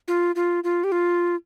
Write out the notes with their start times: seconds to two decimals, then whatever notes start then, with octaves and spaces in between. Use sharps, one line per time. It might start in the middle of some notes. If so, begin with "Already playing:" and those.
0.08 F4
0.36 F4
0.64 F4
0.84 G4
0.92 F4